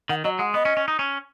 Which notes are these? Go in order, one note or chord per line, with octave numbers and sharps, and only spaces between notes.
D#3 F#5
F#3 D#5
G#3 F#5
B3 D#5
C#4
C#4
D#4
C#4